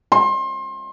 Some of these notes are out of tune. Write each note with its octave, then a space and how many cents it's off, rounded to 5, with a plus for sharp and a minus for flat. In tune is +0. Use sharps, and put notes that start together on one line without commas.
C6 +30